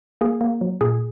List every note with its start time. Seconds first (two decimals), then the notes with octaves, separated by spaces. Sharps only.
0.21 A#3 G#4
0.41 A#3
0.61 F#3
0.81 A#2 G#4